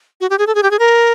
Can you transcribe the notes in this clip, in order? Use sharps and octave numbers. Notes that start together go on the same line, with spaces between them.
F#4
G4
G#4
A4
G#4
G4
G#4
A#4